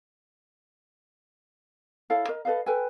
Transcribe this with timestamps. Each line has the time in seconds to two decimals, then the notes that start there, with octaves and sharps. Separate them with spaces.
2.10 E4 A4 C#5 F5
2.29 A#4 D#5
2.45 A4 B4 D#5 F5
2.66 A4 B4 G5 G#5